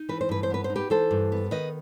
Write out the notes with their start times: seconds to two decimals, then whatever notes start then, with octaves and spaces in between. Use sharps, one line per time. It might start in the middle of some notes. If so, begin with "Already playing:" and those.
Already playing: D#4
0.09 E3 B4
0.21 C5
0.29 G2 B4
0.43 C5
0.50 B3 B4
0.64 C5
0.70 D#4
0.76 G4 B4
0.90 E3 A4 C5
1.11 G2
1.32 B3
1.51 D#3 B4 D#5